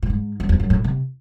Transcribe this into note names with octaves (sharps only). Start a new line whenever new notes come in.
A2
G#2
F#2
E2
F#2
A2
C3